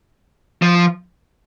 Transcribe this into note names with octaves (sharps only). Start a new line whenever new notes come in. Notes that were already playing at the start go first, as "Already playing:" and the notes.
F3